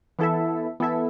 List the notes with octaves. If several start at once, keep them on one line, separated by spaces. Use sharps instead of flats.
E3 B3 E4 A4 E5
E3 B3 E4 A4 E5